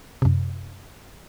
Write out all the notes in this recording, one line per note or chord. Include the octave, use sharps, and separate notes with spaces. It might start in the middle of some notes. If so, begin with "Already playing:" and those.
F#2 C3